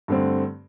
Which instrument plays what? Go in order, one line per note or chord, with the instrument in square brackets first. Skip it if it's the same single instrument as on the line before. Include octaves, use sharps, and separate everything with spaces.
[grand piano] G2 D3 A3 C4